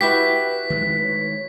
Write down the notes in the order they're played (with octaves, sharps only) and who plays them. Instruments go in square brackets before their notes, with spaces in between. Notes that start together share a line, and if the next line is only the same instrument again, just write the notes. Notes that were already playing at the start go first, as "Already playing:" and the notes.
[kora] E4 F#4 G4 [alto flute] B4 [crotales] B6
[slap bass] D#3 G#3 A3
[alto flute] C#5